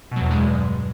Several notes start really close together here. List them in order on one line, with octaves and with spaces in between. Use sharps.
B2 F#3 E2 G2 G#3